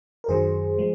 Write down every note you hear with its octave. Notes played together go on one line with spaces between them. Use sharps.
A#4
F#2 D#3 F#3 G#4 C5
F3 G#3